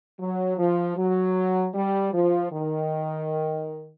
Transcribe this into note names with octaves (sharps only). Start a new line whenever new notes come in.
F#3
F3
F#3
G3
F3
D#3